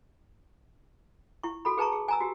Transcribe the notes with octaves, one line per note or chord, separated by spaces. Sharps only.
E4 C#6
F#4 A4 B5
G#4 B4 A5 A#5 C#6
G#4
G#5 A#5 E6
F#4 G4